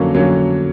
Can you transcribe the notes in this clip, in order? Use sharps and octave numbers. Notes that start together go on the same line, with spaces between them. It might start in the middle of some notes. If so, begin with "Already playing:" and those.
Already playing: F2 D3 F#3 A#3 C#4
D3 F#3 A#3 C#4